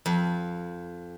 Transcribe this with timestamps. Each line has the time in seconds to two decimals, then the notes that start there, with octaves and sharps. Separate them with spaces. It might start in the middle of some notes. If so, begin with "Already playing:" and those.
0.06 F2